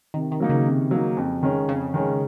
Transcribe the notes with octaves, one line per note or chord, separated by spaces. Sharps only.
C3 D#3
D#3
F#3 A#3 D#4
C#3
C3
F#3 A#3 D#4
F2
D#3 G#3 C#4
F2 C#3
D#3 G#3 C#4